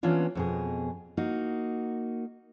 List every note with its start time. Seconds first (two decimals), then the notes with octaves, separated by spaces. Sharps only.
0.03 E3 A#3 B3 C#4 D4 F4
0.35 F2 B2 G#4
1.17 A#3 D#4 F#4